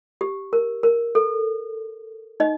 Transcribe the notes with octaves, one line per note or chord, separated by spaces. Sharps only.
G4
A#4
A#4
A4
D#4 D#5